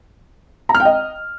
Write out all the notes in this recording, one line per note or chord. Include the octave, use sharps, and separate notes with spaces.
A#5
F6
G5
D#5